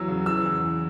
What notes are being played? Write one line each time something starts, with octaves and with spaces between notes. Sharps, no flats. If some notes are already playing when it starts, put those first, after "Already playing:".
Already playing: E2 E3 F#3 E6
C#3
E3 E6
E2
E3